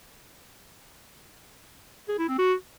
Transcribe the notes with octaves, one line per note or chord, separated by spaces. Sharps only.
G#4
E4
C4
F#4